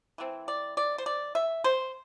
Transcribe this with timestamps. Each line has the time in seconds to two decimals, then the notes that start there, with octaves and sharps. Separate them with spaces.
0.18 E3 A3 C4
0.48 D5
0.77 D5
0.98 C5
1.06 D5
1.35 E5
1.64 C5